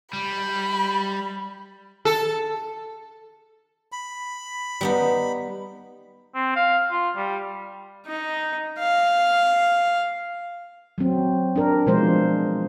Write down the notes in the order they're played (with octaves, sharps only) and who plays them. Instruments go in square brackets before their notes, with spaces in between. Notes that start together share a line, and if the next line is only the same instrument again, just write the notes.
[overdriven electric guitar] G3 [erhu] B5
[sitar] A4
[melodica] B5
[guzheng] G3 B3 D#4
[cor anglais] C4
F5
F4
G3
[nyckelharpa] D#4
F5
[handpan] F#3 C4
D4 A#4
B2 E3 F3 G#3 D4 C5